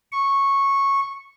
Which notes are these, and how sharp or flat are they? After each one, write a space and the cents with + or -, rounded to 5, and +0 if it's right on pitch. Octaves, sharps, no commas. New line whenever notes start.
C#6 -10